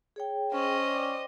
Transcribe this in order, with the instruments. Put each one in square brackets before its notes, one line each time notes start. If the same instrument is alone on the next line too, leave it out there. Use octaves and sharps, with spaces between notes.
[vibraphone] G#4 C#5 G5
[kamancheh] C#4 [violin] C5 D#5
[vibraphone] D5 G5 D6